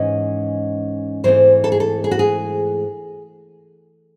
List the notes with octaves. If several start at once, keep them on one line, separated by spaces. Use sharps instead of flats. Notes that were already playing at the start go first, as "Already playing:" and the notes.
Already playing: G#2 E3 G#3 C#4 D#5
G#2 E3 A3 C4 C5
A4
G#4
A4
G#4
F#4
G#4